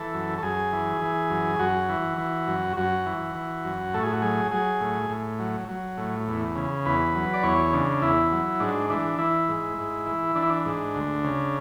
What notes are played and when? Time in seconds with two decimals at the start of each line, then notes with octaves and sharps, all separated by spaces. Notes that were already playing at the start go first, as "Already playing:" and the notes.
Already playing: E3 A4
0.14 F#2
0.38 A4
0.43 F#2 G#4
0.72 E3
1.02 E3
1.30 F#2
1.59 F#2 F#4
1.89 E3
2.18 E3
2.47 F#2
2.77 F#2 F#4
3.06 E3
3.35 E3
3.64 F#2
3.94 A2 A4
4.03 G#4
4.13 F#4
4.22 F#3 G#4
4.51 F#3 G#4
4.80 A2
5.10 A2
5.39 F#3
5.69 F#3
5.98 A2
6.28 E2
6.56 C#3
6.85 E2 B4
7.15 F#3
7.33 D5
7.43 E2 C#5
7.73 C#3 D4
8.02 E2 E4
8.32 F#3
8.60 G#2 D4
8.90 E3 D4
9.18 E3 E4
9.49 G#2
9.78 G#2
10.06 E3
10.35 E3 D4
10.42 E4
10.50 D4
10.65 G#2
10.95 D2
11.24 C#3